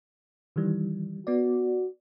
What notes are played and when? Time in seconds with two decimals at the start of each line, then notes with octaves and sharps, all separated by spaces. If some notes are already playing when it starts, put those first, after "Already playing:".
0.56 D#3 E3 G3
1.27 B3 F#4 D5